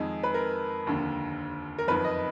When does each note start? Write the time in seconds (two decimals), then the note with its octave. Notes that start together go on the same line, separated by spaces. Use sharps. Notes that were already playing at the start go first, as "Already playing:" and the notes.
Already playing: F2 D#3 G#3
0.23 B4
0.34 A#4
0.86 F1 D#2 D3
1.78 A#4
1.88 F#1 F2 D#3 B4
2.04 D#5